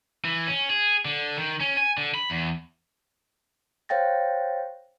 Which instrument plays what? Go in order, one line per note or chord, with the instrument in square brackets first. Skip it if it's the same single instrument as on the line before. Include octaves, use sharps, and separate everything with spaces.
[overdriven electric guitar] E3
C#4
G#4
D3
D#3
C#4
G#5
D3
B5
E2
[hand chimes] C5 C#5 F5 G5 A6 A#6